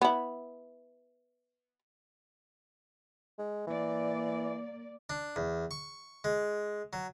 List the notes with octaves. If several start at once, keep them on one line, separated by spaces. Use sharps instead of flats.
B3 E4
G#3
E3 A#3 D5
D4
E2
C#6
G#3
F#3